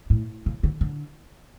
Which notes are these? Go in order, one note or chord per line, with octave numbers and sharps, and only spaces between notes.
A2
C#3
D3
D3